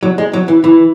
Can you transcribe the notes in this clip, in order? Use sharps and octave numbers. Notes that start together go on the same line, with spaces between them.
F#3
G#3
F#3
E3
E3